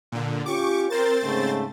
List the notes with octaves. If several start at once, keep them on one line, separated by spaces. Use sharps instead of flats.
A#2 D3
C#4 F4 G4 C#6 D6
C4 A#4 C5 A6
G#2 C#3 A3